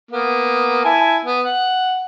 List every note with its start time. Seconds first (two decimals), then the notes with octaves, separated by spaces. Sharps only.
0.11 A#3 B3
0.85 E4 G#5 A5
1.25 B3
1.44 F#5